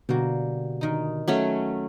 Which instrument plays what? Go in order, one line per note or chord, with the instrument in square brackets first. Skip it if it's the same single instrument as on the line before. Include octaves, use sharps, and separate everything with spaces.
[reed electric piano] B2 D3 F#4 [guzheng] G3 A#3
[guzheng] D#3 D#4
[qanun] F#3 A3 C#4